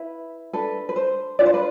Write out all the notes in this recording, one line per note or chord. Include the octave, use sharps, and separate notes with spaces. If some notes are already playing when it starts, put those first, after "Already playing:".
Already playing: E4 B4
D4 A4 B4
B4
C5
D4 F4 B4 D5
C5
B4